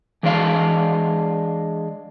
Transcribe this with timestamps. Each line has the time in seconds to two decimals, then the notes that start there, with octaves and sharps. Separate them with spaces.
0.23 E3 G#3 D4 D5 F5